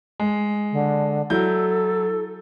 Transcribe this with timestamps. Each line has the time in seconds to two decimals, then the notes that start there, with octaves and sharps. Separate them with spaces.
0.20 G#3
0.72 D3
1.30 F#3 E4 A4 G6